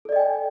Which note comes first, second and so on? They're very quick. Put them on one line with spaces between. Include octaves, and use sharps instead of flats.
A4 D5 D#5 G5 G#5